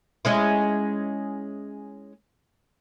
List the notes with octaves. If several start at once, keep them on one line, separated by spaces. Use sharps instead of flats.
G#3 C#4 E4